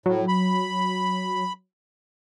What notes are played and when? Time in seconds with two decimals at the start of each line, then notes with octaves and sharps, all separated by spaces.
0.06 A2 F#3
0.28 B5